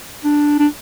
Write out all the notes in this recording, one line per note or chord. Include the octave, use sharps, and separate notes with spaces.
D4
D4